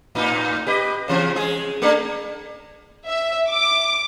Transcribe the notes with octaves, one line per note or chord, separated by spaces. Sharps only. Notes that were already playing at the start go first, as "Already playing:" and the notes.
A2 D#4
G4 B4 D#5
C#3 E3 C4
G#3 G#4
A3 D4
E5
D6